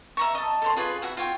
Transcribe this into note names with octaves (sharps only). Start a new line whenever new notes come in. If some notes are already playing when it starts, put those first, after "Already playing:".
E5 A#5 C#6
D#5 A5
A4 C#5 C6
F4 G#4 B4 C#5
F#4 E5 F#5
F4 C#5 G5